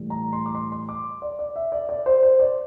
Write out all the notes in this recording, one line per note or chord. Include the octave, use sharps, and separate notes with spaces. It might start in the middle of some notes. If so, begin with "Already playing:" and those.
Already playing: A2 E3 G3
A#5
C6
D6
C6
C6
D6
D5
D5
E5
D5
D5
C5
C5
D5